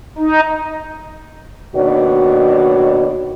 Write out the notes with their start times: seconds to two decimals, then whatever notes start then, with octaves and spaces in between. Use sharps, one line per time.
0.18 D#4
1.76 D#2 B2 D4 F#4 C#5